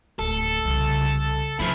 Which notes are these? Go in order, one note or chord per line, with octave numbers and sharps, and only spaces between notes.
D1 A4
C2 C#3
C3 F3 C4 E4